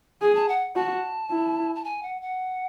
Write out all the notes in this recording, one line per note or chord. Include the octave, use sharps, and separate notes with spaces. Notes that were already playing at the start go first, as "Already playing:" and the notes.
G#4 G#5
A5
F#5
F#4 A5
E4
A5
G#5
F#5
F#5